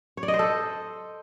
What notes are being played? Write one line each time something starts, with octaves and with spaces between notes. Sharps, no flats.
C#5
D5
D#5
C5
A4